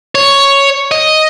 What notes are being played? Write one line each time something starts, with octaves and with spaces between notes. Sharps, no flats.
C#5
D#5